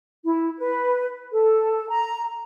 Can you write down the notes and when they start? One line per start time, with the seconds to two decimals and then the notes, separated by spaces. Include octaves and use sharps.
0.24 E4
0.57 B4
1.32 A4
1.89 A#5